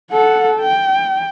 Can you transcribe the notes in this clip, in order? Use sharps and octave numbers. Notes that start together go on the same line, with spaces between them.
A4 F#5
G5